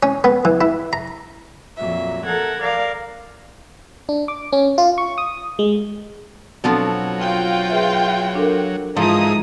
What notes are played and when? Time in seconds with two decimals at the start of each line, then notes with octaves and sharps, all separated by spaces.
0.03 C#4
0.24 B3
0.45 E3
0.61 E4
0.93 A#5
1.76 F2 A#2 F#3 E5
2.24 A4 A#4 F#5 G#6
2.59 A#4 D5 F5
4.09 D4
4.28 D6
4.52 C#4
4.78 F4
4.98 C#6
5.18 D#6
5.59 G#3
6.64 B2 F3 F#3 C4 D4 A4 A5
7.20 F4 G5
7.70 G#4 B4 E5
8.35 D4 A4 A#4
8.96 G#2 E3 F3 G#3 D#4 F4 A#5 D#6